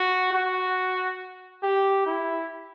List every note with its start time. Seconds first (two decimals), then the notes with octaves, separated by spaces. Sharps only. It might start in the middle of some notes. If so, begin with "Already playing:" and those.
Already playing: F#4
0.33 F#4
1.63 G4
2.06 E4